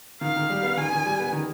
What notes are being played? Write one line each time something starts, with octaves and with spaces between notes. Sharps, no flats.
D#3 F5
D#3
G3
B3
D#3 G#5
D#3
G3
B3
D#3